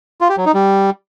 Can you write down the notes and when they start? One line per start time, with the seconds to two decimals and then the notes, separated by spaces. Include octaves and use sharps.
0.21 F4
0.29 G4
0.37 F#3
0.46 D#4
0.54 G3